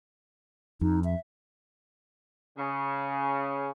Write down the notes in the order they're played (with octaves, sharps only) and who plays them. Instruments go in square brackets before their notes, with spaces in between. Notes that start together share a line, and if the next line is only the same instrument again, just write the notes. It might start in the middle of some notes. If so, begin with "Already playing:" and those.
[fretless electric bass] F2 [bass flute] D#4
[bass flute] E5
[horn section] C#3